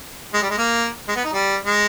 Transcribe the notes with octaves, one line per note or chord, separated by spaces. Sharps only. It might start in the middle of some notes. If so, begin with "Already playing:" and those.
G#3
G3
G#3
A#3
G#3
B3
D#4
G3
G#3